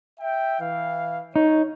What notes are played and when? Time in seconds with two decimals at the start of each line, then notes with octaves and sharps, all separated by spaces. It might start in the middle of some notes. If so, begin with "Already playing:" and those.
0.20 E5 G5
0.60 E3 F5
1.36 D#4 C#5